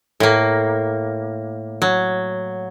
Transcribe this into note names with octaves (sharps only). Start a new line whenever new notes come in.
A2 A#3
F#3